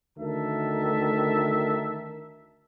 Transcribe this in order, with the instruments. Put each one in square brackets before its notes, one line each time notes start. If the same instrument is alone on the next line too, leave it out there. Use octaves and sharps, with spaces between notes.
[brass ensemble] D2 D#3 A#4 E5 A5